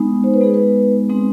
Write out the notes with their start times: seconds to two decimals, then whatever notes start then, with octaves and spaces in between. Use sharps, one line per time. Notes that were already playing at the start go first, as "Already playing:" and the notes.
Already playing: G#3 B3 D#4
0.24 C5
0.34 B4
0.41 G#3 B3 D#4 G#4
0.54 B4
1.09 G#3 C4 D#4